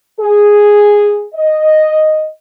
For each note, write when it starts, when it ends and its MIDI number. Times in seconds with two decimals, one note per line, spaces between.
0.20 1.25 68
1.35 2.25 75